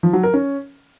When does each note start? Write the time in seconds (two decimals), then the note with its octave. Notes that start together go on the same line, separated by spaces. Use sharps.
0.03 F3
0.13 F#3
0.23 A#4
0.34 C#4